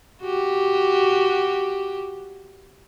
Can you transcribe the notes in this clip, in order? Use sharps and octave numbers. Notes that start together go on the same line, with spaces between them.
F#4 G4